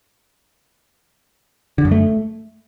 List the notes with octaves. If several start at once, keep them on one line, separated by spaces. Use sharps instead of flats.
D3
F#2
A3